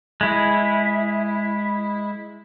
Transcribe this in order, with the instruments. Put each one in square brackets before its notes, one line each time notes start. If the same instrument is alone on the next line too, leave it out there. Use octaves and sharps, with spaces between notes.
[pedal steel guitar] G#3 E4